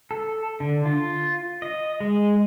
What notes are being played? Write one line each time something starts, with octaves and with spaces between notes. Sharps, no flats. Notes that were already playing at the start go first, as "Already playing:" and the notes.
A4
D3
F4
D#5
G#3